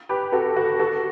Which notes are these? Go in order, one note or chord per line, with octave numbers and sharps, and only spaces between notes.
G4 B4
F#4 A4
F#4 A4
F#4 A4